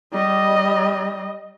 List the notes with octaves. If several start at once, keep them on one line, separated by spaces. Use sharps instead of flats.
G3 D#5